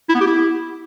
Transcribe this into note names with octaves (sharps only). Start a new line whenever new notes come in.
E4
B3
G4
E4